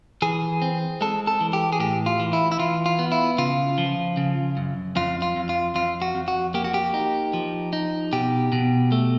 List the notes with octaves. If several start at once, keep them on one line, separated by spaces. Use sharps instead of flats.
E3 G#4
C4
G#3 A4
A4
E3
G4
G#4
A2 G4
F4
E3
E4
E4
E3 F4
F4
B3
E4
C#3 F4
F3
C#3
F#2
F2 F4
F4
F2
F4
F2 F4
F#4
F2
F#4
A#3 G4
F#4
G4
D#4
F3
D#4
B2 G4
B2
A3